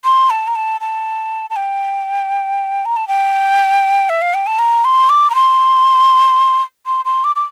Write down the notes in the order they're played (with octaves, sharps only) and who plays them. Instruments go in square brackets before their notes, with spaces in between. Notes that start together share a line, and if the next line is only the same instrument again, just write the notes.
[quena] C6
A5
A#5
A5
A5
A5
G5
A#5
A5
G5
E5
F5
G5
A5
A#5
C6
D6
A#5
C6
C6
C6
D6
D6